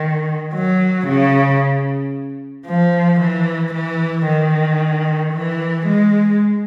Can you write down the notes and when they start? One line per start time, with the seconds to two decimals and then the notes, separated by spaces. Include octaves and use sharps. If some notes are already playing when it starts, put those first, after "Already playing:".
Already playing: D#3
0.54 F#3
1.07 C#3
2.67 F3
3.21 E3
3.74 E3
4.27 D#3
5.33 E3
5.87 G#3